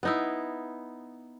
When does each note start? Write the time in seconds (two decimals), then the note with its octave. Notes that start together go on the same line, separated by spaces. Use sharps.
0.03 B3 D#4 E4